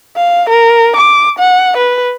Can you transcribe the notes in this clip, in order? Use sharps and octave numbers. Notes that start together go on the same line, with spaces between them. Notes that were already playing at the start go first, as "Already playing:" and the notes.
F5
A#4
D6
F#5
B4